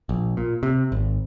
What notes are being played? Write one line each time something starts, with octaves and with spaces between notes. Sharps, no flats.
A#1
A#2
C3
G#1